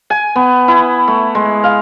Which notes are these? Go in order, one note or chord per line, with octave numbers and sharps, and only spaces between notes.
G#5
B3
E4
A3
G#3
F5